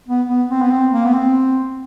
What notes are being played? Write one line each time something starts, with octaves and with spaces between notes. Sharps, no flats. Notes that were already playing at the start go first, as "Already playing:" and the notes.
B3
B3
C4
B3
C4
A#3
B3
C4